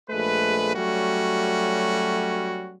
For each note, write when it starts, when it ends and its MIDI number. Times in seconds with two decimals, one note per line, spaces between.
0.10 0.75 34
0.10 0.75 56
0.10 0.75 57
0.10 0.75 71
0.76 2.75 54
0.76 2.75 55
0.76 2.75 57
0.76 2.75 61
0.76 2.75 66